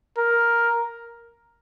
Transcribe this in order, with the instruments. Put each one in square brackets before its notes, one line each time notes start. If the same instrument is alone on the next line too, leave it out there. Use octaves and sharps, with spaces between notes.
[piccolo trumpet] A#4